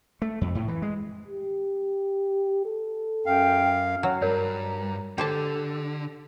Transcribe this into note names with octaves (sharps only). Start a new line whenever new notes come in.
A3
F2
A2
E3
G#3
G4
A4
F#2 F5 G5
F#3 F#5
G2 A#4 C#5 A#5
D3 G4 A4 C5 A5